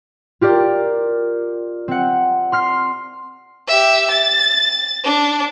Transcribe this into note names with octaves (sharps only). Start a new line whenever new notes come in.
F4 G4 A#4 D5
C4 F#5
C6 F6 C7
G4 E5
A6
D4